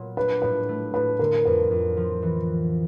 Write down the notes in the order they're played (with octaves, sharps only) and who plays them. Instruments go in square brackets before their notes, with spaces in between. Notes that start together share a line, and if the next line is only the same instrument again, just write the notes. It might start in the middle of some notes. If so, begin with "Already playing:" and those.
Already playing: [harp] A#2 F#3 B3
[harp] D4 [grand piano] B4
[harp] A2 [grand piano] B4
[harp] A3
[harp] A2 [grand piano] B4
[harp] D3 [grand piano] A#4
[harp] F2 [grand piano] B4
[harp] F2
F3
E3